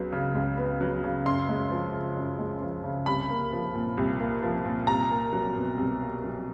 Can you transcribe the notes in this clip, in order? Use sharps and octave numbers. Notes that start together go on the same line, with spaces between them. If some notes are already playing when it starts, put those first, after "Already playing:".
Already playing: C#2 F#3 B3
C#3
C#2
B3
F#3
C#3
F#2 C6
G#3
F3
C#3
F#2
G#3
F3
C#3
C2 B5
A#3
F3
A#2
C2
A#3
F3
A#2
C2 A#5
A#3
F#3
B2
C2
A#3
F#3